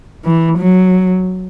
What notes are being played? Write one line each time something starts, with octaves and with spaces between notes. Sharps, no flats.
E3
F#3